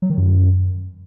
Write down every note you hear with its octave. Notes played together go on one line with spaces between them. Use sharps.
F#3
D#3
F#2